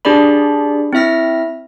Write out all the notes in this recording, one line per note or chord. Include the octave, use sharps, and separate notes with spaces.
D4 G4 G#4 D5 B5
C4 E4 E5 F6 A#6